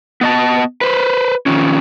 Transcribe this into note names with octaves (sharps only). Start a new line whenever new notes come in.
B3 D#5 A5
B4 C5
D#3 F3 C#4